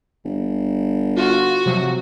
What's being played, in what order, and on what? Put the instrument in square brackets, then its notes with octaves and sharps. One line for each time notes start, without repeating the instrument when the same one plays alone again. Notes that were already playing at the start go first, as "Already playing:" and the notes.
[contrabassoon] G1
[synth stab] F4 [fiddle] F#4
[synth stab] C3 F3 F#3